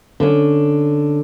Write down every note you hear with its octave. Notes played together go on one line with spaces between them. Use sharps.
D3 C#4